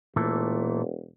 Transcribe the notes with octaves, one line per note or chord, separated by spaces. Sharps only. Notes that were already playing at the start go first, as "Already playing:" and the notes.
E1 A#2 E3 A3